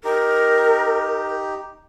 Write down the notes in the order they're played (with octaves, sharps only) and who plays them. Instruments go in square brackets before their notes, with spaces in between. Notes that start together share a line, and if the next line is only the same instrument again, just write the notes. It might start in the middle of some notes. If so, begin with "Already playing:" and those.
[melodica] D#4 G4 [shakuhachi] A#4